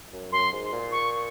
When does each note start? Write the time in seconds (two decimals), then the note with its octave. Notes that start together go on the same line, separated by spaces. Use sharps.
0.13 F#2
0.32 F#2 C6
0.52 G#2
0.72 A#2
0.92 C#6